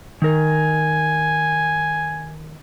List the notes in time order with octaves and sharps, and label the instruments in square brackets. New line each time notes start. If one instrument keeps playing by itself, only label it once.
[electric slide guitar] D#3 A#4 [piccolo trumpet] G#5